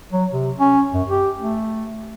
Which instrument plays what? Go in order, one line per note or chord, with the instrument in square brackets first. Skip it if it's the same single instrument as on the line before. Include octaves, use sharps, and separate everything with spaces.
[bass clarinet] F#3
C3
C#4
F#2
G4
A3